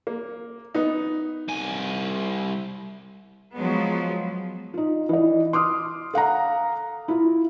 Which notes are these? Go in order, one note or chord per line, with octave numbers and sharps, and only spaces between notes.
A#3
B3 D#4
C2 G#5
F3 F#3 G#3 B3
D#4 F4
E3 D#5
C6 D6 D#6 F6
A4 F5 F#5 A#5
E4 F4